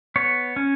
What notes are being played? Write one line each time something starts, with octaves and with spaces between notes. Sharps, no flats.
B3 C#5
C#4